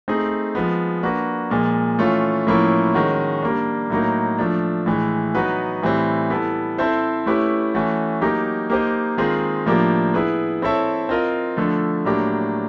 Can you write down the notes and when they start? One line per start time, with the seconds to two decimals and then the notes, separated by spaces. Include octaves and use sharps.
0.08 A3 C4 D#4 G#4
0.55 F3 G#3 B3
1.03 A#3 D4 F#4 B4
1.50 A#2 F3 G#3
1.99 E3 A3 C#4 F4
2.47 A2 F3 A#3 C#4 E4
2.94 D#3 G#3 C#4 F#4
3.42 G3 A#3 D4
3.90 A2 F#3 A#3 D#4
4.38 F3 A3 D4
4.86 A2 E3 G#3
5.35 F#3 B3 D#4 F#4 B4
5.83 A2 E3 G3 C4
6.30 G3 B3 E4 A4
6.78 C4 E4 A4 C5 E5
7.26 A3 C#4 E4 G4 B4
7.74 E3 A3 C#4 F#4
8.21 F#3 A#3 D#4 G4
8.70 A#3 D#4 G4 C5 D#5
9.17 D#3 G#3 C4 F4 G#4
9.66 A2 F3 A#3 D4 G4
10.14 B3 E4 G#4 B4
10.62 C4 E4 A4 C#5 E5
11.09 C4 F4 A#4 D#5
11.57 D3 F3 A3
12.05 A2 F#3 A#3 D4 G4